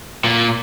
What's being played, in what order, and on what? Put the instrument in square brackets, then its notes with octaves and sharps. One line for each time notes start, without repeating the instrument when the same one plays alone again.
[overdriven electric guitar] A#2